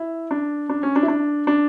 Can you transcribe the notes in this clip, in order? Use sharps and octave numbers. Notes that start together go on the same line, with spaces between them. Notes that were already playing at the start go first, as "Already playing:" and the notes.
Already playing: E4
D4
D4
C#4
D4
E4
D4
D4